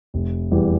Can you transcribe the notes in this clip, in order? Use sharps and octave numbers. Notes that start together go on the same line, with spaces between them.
F1
E2 E3 G3